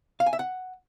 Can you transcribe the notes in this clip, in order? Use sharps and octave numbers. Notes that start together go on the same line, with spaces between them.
F5
G#5
E5
F#5